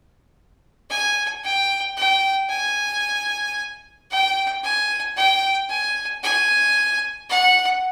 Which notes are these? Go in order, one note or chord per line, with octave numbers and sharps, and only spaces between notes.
G#5
G5
G5
G#5
G5
G#5
G5
G#5
G#5
F#5